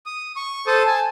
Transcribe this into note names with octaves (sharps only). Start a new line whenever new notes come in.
D#6
C#6
A4 C5 A5 D#6
G#5 A5